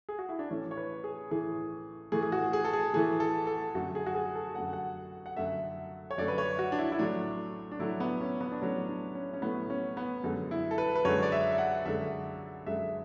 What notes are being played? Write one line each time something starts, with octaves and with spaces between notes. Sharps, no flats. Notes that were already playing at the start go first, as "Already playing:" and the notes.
G#4
F#4
E4
D4
A2 E3 A3 C#4
C#5
B4
G#4
A2 E3 A3 G#4
A2 E3 A3 G#4
G#4
F#4
G#4
A4
G#4
A2 E3 A3 G#4
A4
A4
F#2 D3 A3 F#4
G#4
F#4
G#4
A4
F#2 D3 A3 F#5
F#5
F#5
F#2 D3 A3 E5
C#5
F#2 D3 A3 D5
B4
C#5
F#4
D4
E4
E4
A2 F#3 A3 D4
D4
A2 F#3 A3 E4
B3
C#4
B3
D4
A2 F#3 A3 C#4
D4
C#4
C#4
A2 F#3 A3 B3
C#4
B3
F#2 D3 G#3
E4
A4
B4
B4
F#2 D3 G#3 C#5
D5
E5
E5
F#5
F#2 D3 G#3 E5
F#2 D3 G#3 E5